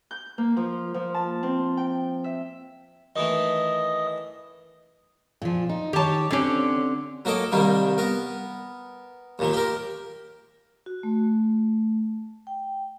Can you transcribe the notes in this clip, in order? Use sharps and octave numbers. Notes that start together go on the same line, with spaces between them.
G6
A#3
F3
F3
A5
C4
G5
E5
D#3 E3 A3 D#5 D#6
A#2 F3
D#4
D#3 G4 C#5 A5
D3 C4 C#4 G4
F#3 A#3 A4 D#5 D6
C2 D#3 G3 A#3
B3 A#4
D#2 A#2 D#3
G4 A#4
F#4
A3
G5